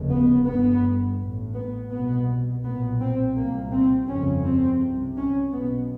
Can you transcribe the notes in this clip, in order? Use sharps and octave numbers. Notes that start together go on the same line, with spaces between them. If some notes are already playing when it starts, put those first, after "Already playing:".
Already playing: F1 D#2 C#3
B3
G1 G2 B3
A1 A2
B3
C2 B2 B3
B1 A#2 B3
C4
C2 A#2 A#3
C4
G1 F2 C#3 C#4
C4
C2 C3
C#4
B1 B2 B3